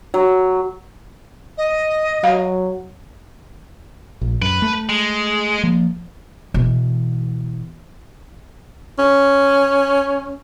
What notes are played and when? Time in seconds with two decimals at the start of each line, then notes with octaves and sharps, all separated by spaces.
0.14 F#3
1.57 D#5
2.24 F#3 F5
4.21 A#1
4.42 F#2 B4
4.62 A3
4.89 G#3
5.63 F3 A#3
6.54 B2 E3
8.99 C#4